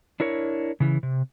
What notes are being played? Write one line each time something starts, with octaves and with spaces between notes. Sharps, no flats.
D4 E4 A#4 C#5
C#3 E3
C3